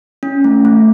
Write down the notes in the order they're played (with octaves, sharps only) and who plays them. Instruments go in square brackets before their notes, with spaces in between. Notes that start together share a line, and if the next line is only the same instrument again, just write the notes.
[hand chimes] C#4
A3
A3